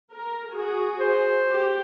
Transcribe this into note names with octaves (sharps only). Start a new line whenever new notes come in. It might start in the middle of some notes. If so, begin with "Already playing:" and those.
A#4
F#4 G#4
C5
G4